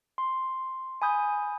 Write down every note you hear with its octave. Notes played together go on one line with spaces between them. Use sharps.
C6
G#5 B5 D#6 G6